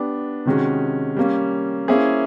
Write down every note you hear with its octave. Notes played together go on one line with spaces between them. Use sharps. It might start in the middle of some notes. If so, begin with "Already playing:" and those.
Already playing: B3 D4 G4
C3 D#3 G#3 C#4 F#4
G3 A#3 C#4
A#3 C#4 E4 G#4 C5